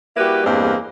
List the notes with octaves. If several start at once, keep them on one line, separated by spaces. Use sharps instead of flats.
G3 A#3 E4 F#4 G4 B4
E2 G2 G3 G#3 A#3 C4